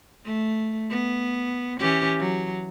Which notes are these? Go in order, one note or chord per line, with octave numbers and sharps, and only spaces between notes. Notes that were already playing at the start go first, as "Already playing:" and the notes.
A3
B3
E3 C#4 G4
F#3